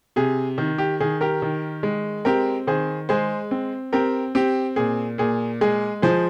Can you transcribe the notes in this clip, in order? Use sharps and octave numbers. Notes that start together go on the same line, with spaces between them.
C3 G#4
D#3
G4
D#3 G#4
G4 A#4
D#3
G#3
C4 G4 A#4
D#3 G#4 C5
G#3 G#4 C5
C4
C4 G4 A#4
C4 G4
A#2 G#4
A#2 G#4
G#3 G#4
F3 G#4 C5